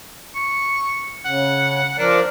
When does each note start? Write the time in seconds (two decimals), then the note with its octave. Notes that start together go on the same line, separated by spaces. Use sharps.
0.35 C#6
1.25 C#3 F#5
1.98 F3 D4 A#4 D5